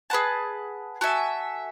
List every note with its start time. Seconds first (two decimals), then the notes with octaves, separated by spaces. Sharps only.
0.10 G#4 B4 F#5 A5
1.01 F#4 A4 E5 G#5